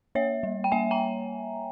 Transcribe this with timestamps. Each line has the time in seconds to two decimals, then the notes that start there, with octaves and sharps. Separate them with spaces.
0.15 A#3 C#5 E5
0.43 G3
0.64 G5
0.72 A#3 E5 G#5
0.91 G5 A#5